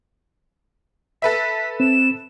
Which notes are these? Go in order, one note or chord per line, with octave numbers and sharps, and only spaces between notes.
A4 B4 E5 B6
C4 E7